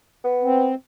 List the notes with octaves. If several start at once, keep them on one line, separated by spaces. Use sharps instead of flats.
B3
C4